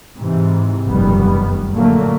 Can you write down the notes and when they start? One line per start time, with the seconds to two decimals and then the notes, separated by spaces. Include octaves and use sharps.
0.17 G#2 C3 E3
0.86 F1 B1 F#2 D#3 G3 B3
1.74 A#2 D3 F#3 A3 A#3